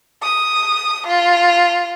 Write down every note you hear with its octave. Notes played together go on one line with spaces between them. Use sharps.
D#6
F4